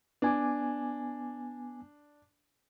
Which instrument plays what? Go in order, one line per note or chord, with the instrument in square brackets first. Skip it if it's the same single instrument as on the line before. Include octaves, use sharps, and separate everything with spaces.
[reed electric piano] B3 G#5 D6 [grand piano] D4